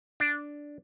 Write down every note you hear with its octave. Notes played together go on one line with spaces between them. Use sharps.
D4